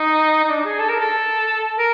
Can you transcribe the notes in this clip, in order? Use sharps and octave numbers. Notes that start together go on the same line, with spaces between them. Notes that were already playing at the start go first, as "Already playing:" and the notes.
Already playing: D#4
D#4
D4
G#4
A4
A#4
A4
A#4